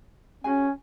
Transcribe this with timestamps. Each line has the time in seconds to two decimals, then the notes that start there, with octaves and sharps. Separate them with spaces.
0.44 C#4 F#4 G#4 G#5